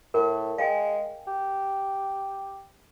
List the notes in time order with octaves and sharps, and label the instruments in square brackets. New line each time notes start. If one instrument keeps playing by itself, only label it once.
[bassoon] A2 [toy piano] A#4
[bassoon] G#3 [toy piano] F5 G5 G#5
[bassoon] G4